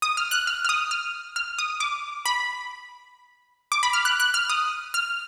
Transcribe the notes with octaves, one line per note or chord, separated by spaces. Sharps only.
D#6
F6
F#6
F6
F6
D#6
F6
F6
D#6
D6
B5
D6
B5
F6
F#6
F#6
F6
D#6
F6